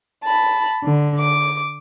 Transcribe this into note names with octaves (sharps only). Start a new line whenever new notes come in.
A5 B5
D3
D6